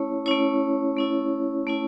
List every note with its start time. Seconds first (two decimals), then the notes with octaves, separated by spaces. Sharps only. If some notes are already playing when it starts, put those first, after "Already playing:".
Already playing: A3 C#4 E4 C#5
0.26 A3 C#4 E4 C#5
0.96 A3 C#4 E4
1.67 A3 C#4 E4